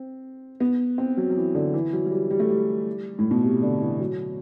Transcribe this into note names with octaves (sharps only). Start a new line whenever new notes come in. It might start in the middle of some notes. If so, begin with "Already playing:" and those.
Already playing: C4
B3
C4
F#3
F#3
E3
D3
E3
F#3
F#3
G3
G3
A3
G3
A2
B2
C3
D3
E3
F#3